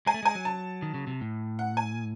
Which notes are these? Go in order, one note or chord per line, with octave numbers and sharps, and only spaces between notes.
G#3 G#5
A3
G#3 G#5
F#3
A5
D#3
C#3
C3
A2
F#5
G#5